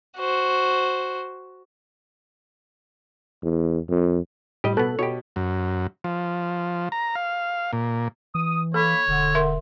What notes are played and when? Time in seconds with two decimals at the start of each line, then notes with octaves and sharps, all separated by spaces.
0.19 F#4 C5
3.43 E2
3.89 F2
4.64 A2 G3 G4 D#5
4.77 B2 B3 A4 F#6
4.99 B2 G4 C#5
5.36 F#2
6.04 F3
6.92 A#5
7.15 F5
7.73 A#2
8.35 E3 D#6
8.74 A#3 A4 C#5 B5
9.08 E1 D3
9.35 A#4 E5 C6